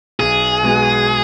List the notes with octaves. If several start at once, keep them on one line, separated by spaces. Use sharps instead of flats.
B1 G#4
B2 G#3 B3 F#4